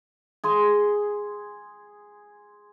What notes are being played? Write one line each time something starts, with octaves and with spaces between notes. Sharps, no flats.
G#4 C6